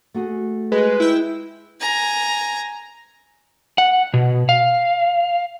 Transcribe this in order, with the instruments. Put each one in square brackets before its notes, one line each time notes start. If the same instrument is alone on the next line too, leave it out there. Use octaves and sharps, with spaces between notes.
[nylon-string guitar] A3 F#4 G#4
[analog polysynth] G#3 [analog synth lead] B4
[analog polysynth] E4 G5
[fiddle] G#5 A#5
[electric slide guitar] F#5
B2
F5